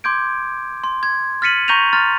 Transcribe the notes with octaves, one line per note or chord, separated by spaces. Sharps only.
C6 D6 G6 G#6 D7
C6
G#6
F6 A6 B6 C#7 D#7 F#7
A#5 C#6 G6 A#6 D#7 F7
A#5 C6 F6 A6